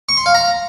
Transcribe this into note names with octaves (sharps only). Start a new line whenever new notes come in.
C#6
C6
F5
A#5